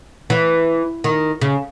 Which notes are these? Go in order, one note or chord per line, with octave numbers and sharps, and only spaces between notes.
E3
D#3
C#3